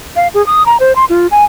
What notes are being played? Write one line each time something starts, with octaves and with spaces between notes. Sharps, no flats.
F5
G#4
D#6
A#5
C5
C6
F4
G#5